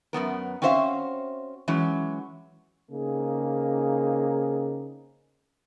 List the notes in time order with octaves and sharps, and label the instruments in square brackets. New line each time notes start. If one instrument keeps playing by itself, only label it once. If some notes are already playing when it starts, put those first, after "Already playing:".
[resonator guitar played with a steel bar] F#2 B2 B3 A#4
C4 C#4 F#4 C5 E5 F5
E3 F#3 G#3 C#4
[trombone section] C#3 A#3 C4 D#4 G#4